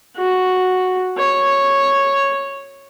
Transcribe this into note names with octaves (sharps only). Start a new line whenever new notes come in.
F#4
C#5